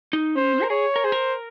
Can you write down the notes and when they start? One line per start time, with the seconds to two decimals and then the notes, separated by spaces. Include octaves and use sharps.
0.13 D#4
0.36 C#4 C5
0.53 C4
0.63 A#4
0.70 G#4 C#5
0.96 A#4
1.04 G#4 C5
1.12 A#4